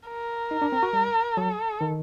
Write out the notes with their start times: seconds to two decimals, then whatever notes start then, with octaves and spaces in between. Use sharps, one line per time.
0.08 A#4
0.51 D#4
0.62 D4
0.72 C4
0.83 F#4
0.93 G3
1.37 F#3 A4
1.81 D#3